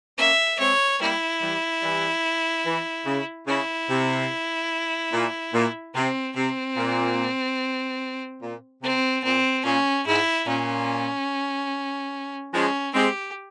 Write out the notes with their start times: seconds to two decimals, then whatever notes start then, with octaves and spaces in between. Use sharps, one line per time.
0.18 A#3 C#4 E5
0.59 G#3 C4 C#5
1.01 G3 A#3 E4
1.41 E3 G3
1.82 E3 G3
2.66 E3
3.06 C#3
3.47 C#3 E4
3.89 C3
5.12 A#2
5.54 A#2
5.94 C3 C4
6.36 C3 C4
6.77 A#2
8.42 A#2
8.83 C3 C4
9.24 A#2 C4
9.65 A#2 C#4
10.06 G#2 E4
10.47 A#2 C#4
12.53 F3 G#3 C#4
12.94 G#3 C4 G4